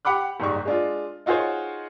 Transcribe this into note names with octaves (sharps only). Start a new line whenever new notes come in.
G4 F#5 B5 D6 F#6
F#1 G#2 G3 C#6
G#3 D4 F4
D#4 F4 F#4 G#4 C5 C#5